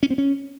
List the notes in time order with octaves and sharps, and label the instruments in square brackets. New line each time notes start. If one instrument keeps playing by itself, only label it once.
[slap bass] C#4
C4
C#4